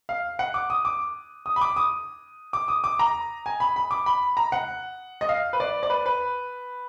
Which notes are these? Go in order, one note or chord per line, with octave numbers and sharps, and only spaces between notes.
F5
F#5
D6
D#6
D6
D#6
B5
D6
D#6
D6
D#6
D6
A#5
G#5
B5
B5
D6
B5
A#5
F#5
D#5
F5
B4
D5
D5
B4
B4